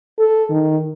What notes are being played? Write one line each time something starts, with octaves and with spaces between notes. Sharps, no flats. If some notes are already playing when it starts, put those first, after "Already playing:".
A4
D#3